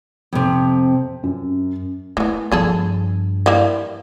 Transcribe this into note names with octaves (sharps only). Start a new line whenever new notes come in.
F2 C3
F#2
E3 A3 B3
G2 F3 B3 G#4 A4
E3 G3 A#3